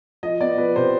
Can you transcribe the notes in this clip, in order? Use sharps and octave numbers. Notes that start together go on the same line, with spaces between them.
F3 D#5
B3 D5
F3 B4
C3 C5